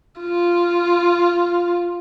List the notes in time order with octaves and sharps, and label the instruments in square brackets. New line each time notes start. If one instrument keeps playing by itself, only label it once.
[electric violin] F4